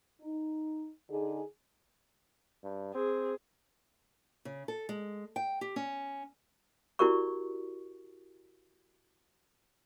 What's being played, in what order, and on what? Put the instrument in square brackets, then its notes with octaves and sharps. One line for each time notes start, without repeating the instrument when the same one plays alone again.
[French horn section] D#4
D3 D#4 G#4
[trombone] G2
[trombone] C4 [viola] G#4
[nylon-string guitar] C#3
A4
G#3
G5
G4
C#4
[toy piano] E4 F#4 G4 A#4 D5 C#6